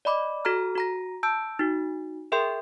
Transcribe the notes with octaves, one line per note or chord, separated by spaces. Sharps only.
D5 D#5 B5 D6
F#4 A4 A#5 F6
F#4 A#5 A#6
A5 E6 G6 D7
D#4 F#4
G#4 A#4 E5 G5 C6 G6